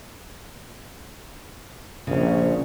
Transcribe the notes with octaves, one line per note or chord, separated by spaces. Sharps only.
A#1 C#3